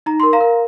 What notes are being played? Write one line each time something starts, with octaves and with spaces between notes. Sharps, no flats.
D#4 A#5
A#4 C6
F5 A#5
A#4